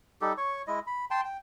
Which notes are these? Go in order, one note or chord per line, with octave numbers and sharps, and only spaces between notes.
G3 D#4 G4 A4
C#5 C#6
G#3 E4 D#5
B5
G5 A5 C6
G5